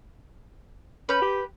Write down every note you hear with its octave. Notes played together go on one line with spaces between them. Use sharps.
C#4 B4 G6
G4